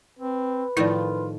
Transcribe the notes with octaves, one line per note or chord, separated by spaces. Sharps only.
C4 B4
A2 D#3 F3 E4 F4 D5